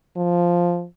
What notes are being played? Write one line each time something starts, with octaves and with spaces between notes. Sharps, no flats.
F3